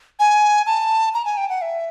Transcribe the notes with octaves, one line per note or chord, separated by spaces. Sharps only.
G#5
A5
A#5
G#5
G5
F#5
E5